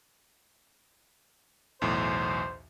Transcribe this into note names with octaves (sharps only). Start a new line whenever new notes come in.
B1 E2 A2 C5